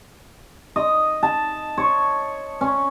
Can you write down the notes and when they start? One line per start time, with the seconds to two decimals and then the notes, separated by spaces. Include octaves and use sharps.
0.76 D#5
1.23 A5
1.78 C#5
2.61 C#4